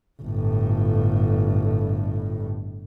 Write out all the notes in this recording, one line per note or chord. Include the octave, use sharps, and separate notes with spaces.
G1 A2